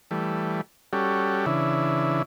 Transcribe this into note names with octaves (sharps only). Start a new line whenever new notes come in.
E3 G3 A3
G3 C#4 F#4 G4 A4
C#3 E3 D4 E4